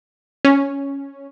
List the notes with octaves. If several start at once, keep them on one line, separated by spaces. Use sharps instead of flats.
C#4